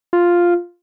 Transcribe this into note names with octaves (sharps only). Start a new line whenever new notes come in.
F4